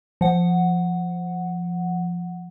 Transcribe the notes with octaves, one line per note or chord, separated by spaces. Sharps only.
F3 F#5